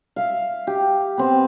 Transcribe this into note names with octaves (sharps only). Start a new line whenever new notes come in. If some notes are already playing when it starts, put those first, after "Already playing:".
E5 F5
G4
B3 C4